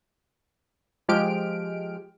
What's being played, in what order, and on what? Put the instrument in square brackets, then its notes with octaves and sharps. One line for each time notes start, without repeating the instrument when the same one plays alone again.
[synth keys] F3 G#3 G4 F6 D7